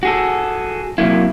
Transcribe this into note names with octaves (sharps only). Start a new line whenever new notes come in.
F#4 G#4 A4
C3 F#3 A#3 E4